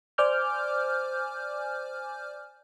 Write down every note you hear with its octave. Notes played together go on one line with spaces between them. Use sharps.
C5 D5 G#5 D6 F6 G6